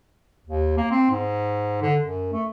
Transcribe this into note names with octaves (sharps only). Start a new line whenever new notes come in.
D#2
A#3
C4
G#2
D3
F#2
A3